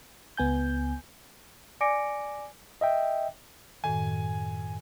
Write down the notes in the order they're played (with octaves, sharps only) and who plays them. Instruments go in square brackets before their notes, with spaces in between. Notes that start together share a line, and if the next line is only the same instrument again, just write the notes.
[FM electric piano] C#2 B3 G#5 G6
[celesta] D5 G#5 D6 A#6 C#7 D7
[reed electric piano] D#5 E5 G5
[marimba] F#2 A2 D#3 [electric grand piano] G#5